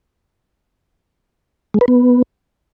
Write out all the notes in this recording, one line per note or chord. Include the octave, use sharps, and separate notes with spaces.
G#3
B4
B3